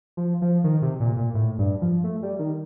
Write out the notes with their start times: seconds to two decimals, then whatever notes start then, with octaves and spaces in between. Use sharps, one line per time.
0.17 F3
0.42 F3
0.64 D#3
0.82 C3
1.00 A#2
1.17 A#2
1.34 A2
1.58 G2
1.82 F3
2.04 A3
2.23 G3
2.39 D#3